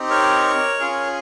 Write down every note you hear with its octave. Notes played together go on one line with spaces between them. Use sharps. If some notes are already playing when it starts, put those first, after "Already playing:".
Already playing: C4 D#4 G4
A#4 C#5
C#4 F4 G#4